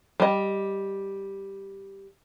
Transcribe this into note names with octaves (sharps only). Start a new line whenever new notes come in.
G3 D#5